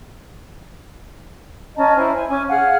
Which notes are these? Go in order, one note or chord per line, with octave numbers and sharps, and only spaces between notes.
C#4 D#5 A5 A#5
E4 C5 G#5
G#5
C#4 G#5 D6
G#4 F5 F#5 F6